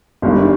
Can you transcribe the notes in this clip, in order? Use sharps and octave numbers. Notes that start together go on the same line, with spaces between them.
G1 G2 D#3